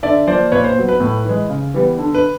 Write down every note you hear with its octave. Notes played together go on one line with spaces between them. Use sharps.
D3 D5 E5
F3 A#3 C5 D5
A#2 B4 C#5
C5
F#3 B3
B4
A2
E3 G#3
C#3
E3 G3 B3
D3
B4